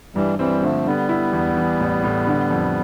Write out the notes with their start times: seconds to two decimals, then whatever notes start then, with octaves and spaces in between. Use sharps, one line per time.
0.15 G2 E3 G3
0.39 E3 G3 C4
0.62 D3 F3 A3
0.86 D3 G3 B3
1.09 E4
1.33 E2
1.57 E3
1.80 A1
2.04 A2
2.27 D3
2.51 F2